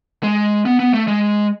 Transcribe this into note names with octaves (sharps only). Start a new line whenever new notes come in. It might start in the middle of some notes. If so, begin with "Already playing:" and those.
G#3
B3
B3
A3
G#3